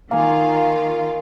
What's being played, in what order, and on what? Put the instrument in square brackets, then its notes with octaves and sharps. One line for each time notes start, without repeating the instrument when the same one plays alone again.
[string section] D#3 F4 [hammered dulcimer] A#3 G#5 [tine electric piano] F5